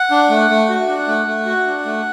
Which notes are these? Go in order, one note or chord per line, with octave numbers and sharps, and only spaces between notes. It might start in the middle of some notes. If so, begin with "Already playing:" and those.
Already playing: F#5
D4
A3
A3
F#4
D4
A3
A3
F#4
D4
A3